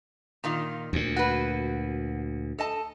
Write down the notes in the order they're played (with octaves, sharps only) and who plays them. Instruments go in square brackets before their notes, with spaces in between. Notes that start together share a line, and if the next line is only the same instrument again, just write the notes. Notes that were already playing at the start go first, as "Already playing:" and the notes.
[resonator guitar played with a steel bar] A#2 D#3 F4
[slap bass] D2 A#2
[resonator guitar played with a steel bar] F#4 B4
A4 D#5 A5